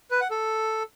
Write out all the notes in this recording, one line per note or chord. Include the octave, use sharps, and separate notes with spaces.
B4
F#5
A4